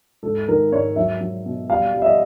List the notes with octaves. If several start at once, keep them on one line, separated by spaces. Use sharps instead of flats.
G#2 A4
D#3 A#4
G#2 C#5
F#3 E5
F#3
B2
G3 F5
G3
E5
D#5